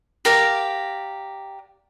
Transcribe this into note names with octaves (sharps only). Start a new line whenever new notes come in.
G4 A#4 D5 F5